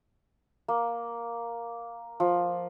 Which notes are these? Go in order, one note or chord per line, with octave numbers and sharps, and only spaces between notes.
A#3
F3